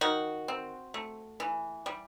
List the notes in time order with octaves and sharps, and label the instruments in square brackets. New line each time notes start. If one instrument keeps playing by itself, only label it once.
[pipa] D#3 F#4
C4
A3
E3
G3